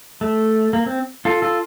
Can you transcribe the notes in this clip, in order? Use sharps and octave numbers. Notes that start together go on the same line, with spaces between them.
A3
A#3
C4
F4 A4
F4 A4